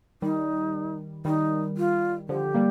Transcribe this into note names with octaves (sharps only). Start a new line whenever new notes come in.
D#3 G3 D#4
D#3 G3 D#4
F4
D3 F3 G4
G3 A#3